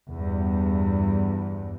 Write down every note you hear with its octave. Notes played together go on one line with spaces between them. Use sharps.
E2 G2